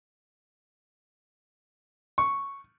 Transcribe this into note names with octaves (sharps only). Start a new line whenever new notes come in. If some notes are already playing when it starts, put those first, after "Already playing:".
C#6